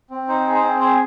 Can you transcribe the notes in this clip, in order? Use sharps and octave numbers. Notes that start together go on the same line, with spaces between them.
C4
D#4 C5
G#4
C5
C4
G#4 C5